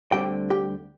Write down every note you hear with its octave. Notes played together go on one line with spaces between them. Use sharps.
D2 D3 G3 C4 G4 G5
G4 G5